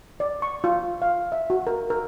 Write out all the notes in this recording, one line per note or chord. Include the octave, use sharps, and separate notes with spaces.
D5
C#6
F4
F5
E5
F#4
A#4
A#4